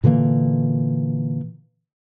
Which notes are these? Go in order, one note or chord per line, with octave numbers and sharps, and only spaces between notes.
A#2 D3 E3 A#3